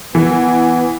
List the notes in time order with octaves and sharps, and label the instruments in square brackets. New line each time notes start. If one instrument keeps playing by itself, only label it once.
[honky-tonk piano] E3 [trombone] B3